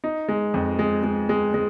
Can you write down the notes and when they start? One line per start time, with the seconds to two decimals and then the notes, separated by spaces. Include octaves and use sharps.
0.04 D#4
0.28 G#3
0.54 F2
0.79 G#3
1.03 G#3
1.29 G#3
1.54 G#3